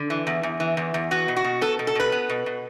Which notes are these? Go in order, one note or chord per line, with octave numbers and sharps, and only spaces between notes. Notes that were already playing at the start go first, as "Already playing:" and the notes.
Already playing: D3
E3
E2
E2
E3
E2
E2
B3 F#4
B2
F#4
B2
B3 A4
B2
A4
B2 B4
B3
B2
B2